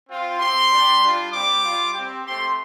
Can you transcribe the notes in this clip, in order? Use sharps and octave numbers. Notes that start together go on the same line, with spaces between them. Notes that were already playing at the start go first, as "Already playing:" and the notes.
C4 F4
C4 G4 C6
G3 D4 G4
G3 D4 F4
G3 C4 G4 D6
G3 F4
C4 G4
A3 C4 G4 C6